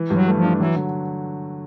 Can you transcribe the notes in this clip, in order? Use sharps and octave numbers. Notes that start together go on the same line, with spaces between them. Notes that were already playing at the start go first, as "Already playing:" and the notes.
Already playing: E3
G2
F#3
A3
F3
D4
E3 F#3
D3